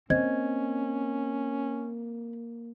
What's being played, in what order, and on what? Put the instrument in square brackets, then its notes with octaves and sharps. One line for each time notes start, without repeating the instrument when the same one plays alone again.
[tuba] A#3 [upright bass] C4 [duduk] C#4 [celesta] C5 D#5 G#6